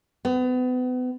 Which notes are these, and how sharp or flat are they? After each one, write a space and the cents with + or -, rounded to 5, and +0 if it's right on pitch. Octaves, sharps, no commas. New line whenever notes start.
B3 +35